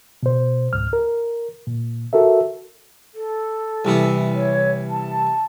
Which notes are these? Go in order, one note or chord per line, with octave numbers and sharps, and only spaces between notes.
B2 C5
C#2 G#2 F6
A#4
A#2
F#4 A4 A#4 E5
A4
C2 E3 B3
C#5
A5